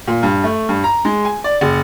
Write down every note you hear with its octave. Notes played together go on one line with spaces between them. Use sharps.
A#2
G2
A3
G2
A#5
G#3
G#5
D5
F#1